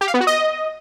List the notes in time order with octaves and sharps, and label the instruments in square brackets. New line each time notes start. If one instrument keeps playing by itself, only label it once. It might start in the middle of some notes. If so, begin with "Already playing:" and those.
[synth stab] G4
F5
B3
F#4
D#5